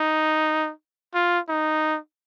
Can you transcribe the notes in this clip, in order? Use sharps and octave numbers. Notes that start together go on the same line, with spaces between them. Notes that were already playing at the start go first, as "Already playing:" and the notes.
Already playing: D#4
F4
D#4